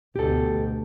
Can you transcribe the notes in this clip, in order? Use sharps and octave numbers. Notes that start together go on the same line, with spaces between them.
D2 B2 G4 A4